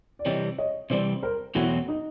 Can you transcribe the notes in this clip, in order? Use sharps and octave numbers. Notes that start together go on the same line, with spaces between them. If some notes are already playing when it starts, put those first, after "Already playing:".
D5
C3 E3 G3 C4 C#5 D#5
C#5 D#5
C3 E3 G3 C4 C5 D5
A#4 C5
E2 B2 F#3 A3 C4 E4 F#4
D#4